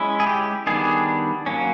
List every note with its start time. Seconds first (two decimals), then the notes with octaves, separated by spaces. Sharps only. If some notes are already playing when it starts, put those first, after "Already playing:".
Already playing: G#3 C#4 E4
0.20 G#4
0.27 G4
0.67 D#3 G3 B3 D4 G#4
1.46 F#3 A#3 C#4